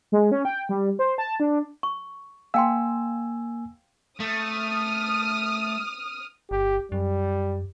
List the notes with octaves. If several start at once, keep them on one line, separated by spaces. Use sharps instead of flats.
G#3
C#4
G5
G3
C5
A5
D4
C#6
A#3 F5 G5 G#5 C6 E6
A3 D#6 F6
G1 G4
F#2 G3